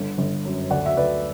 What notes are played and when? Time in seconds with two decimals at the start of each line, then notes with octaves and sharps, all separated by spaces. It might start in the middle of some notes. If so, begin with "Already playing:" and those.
Already playing: G1 D3
0.18 G1
0.45 F#2
0.71 D2 D5 F#5
0.86 E5
0.97 D2 B4 D5